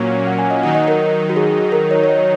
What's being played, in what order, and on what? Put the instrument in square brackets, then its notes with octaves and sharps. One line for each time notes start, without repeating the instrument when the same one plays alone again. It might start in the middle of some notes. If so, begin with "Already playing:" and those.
Already playing: [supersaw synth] A#2 F#3 A#3 C#4 [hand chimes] C#5
[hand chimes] F#5
G#5
D#5
[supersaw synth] D#3 F#3 D#4 [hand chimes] F#5
[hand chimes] D#5
A#4
F#4
G#4
A#4
C#5
C#5
D#5